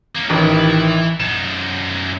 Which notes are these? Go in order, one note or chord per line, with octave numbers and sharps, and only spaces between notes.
A#3 C#4
A1 D#3 E3 B4
F#2 D#4 E7